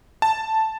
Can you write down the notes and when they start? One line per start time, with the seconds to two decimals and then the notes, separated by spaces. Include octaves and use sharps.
0.22 A5